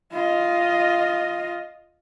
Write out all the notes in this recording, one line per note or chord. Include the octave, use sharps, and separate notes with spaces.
F4 D#5